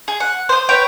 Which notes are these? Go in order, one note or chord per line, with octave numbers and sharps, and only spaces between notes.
G#4
F#5
C5 D#6
B4 C#5 G5